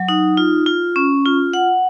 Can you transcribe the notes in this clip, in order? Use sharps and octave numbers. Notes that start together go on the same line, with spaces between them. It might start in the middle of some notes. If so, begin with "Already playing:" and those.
Already playing: F#3
D#4
F4
F4
C#4
F4
F#5